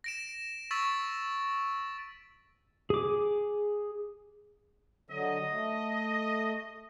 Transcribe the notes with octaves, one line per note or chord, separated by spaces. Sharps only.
A#6 D7 E7
C#6 E6 A6 B6
G#4 D6
D3 F#3 D#5
A3